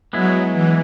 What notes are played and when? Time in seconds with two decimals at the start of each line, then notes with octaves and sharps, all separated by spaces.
0.13 F#3 G#3 B3 E4
0.52 E3